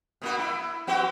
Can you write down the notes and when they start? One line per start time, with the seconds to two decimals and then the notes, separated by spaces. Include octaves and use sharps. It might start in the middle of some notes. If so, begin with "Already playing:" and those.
0.22 B2 A#3 F#4
0.39 E4
0.87 B3 F#4 G4